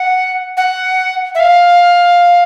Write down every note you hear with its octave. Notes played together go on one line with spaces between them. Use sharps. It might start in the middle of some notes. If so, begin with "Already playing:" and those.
Already playing: F#5
F#5
E5
F5